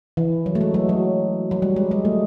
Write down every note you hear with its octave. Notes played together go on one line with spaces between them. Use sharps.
E3
F#3
A3
G#3
F#3
F#3
F#3
G3
G#3
G#3
A3